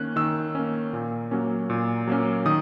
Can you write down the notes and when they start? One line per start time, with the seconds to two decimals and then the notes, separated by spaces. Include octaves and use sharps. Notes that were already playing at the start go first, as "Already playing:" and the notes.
Already playing: D#3 A#3 C#4 F#6
0.16 D#3 E6
0.55 A#3 C#4
0.93 A#2
1.31 F#3 A#3 C#4
1.70 A#2
2.08 F#3 A#3 C#4
2.46 D#3 D#6